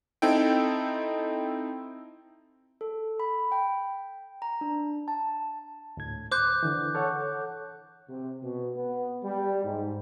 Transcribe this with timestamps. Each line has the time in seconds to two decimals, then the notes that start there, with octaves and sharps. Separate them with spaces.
0.22 C4 D#4 E4 A4 G5
2.81 A4
3.20 B5
3.52 G5
4.42 A#5
4.61 D4
5.08 A5
5.97 D2 A2 G#6
6.32 C5 D6 F#6 G6
6.63 D3 E3
6.95 A4 C#5 F#5
8.10 C3
8.43 B2
8.76 B3
9.24 G3
9.64 G#2